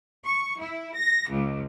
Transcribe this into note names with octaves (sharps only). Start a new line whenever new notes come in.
C#6
E4
A#6
C#2